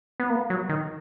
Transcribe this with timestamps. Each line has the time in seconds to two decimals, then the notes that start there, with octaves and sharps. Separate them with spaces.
0.20 B3
0.30 A#3
0.50 F#3
0.69 D#3